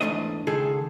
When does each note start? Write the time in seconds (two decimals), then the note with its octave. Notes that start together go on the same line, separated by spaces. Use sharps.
0.01 E2 G#2 A3 D4 D#5
0.47 C#2 D#3 F4 G#4 A4